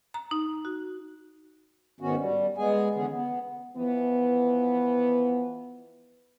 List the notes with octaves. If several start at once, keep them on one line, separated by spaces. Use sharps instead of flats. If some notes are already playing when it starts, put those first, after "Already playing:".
A#5
D#4
F#4
G#2 D#3 B3 C#4 F#4
G3
G#3 B3 G#4 G#5
D3 E3 B3 C#4 G#4
B3
E3 F3 B3